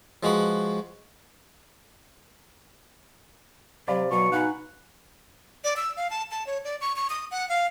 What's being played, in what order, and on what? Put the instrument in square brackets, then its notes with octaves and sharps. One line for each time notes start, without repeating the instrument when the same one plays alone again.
[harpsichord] F3 G#3 F#4 B4
[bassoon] C3 [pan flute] F#3 [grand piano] D5 F5 B5
[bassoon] B2 [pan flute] F#3 [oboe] C#6
[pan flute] D#4 [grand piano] F5 G#5 B5 [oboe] F#5
[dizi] D5
E6
F5
A5
A5
C#5
D5
C#6
C#6
D#6
F#5
F5